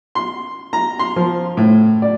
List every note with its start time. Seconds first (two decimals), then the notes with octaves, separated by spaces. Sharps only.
0.15 C6
0.73 A#5
0.99 C6
1.16 F3
1.57 A2
2.02 D5